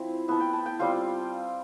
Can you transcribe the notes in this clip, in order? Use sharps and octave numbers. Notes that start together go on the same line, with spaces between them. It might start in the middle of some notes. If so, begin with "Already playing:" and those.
Already playing: F3 C4 E4
B3 E4 A5
G5
A5
G5
G3 C4 F4 F5